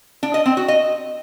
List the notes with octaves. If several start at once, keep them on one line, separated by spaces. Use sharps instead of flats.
D4
D#5
C4
F#4
D#5